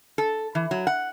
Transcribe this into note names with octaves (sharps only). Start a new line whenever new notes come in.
A4
E3
F#3
F#5